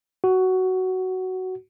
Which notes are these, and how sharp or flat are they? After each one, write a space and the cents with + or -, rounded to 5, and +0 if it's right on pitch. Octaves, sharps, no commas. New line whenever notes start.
F#4 +10